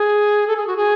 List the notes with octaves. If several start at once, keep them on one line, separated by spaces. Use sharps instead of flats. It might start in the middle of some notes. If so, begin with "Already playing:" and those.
Already playing: G#4
A4
G#4
F#4
G#4